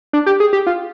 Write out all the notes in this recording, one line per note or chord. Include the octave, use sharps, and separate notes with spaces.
D4
G4
G#4
G4
F4